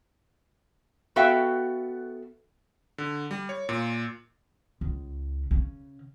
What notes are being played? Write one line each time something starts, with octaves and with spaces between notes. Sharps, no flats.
B3 F#4 A4 E5 F5 G5
D3
G3
C#5
A#2
C#2
C#3